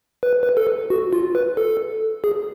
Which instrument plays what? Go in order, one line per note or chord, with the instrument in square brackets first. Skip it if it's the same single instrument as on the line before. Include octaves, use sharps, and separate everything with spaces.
[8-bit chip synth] B4
B4
A4
F#4
F4
B4
A4
G#4